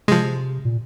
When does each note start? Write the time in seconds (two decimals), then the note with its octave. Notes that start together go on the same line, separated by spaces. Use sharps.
0.08 C3 F3 G#3
0.65 A#2